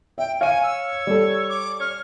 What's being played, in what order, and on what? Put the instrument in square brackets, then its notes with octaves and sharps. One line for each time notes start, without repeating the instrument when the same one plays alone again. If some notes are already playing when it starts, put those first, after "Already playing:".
[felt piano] E5 [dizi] G5
[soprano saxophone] C#5 [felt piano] F5 D#7 [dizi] G#5
[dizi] E6
[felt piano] G3 A4
[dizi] D6
[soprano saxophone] C#5 [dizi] F6